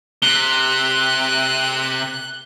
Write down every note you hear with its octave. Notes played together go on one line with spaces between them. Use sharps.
C3 F#6 G7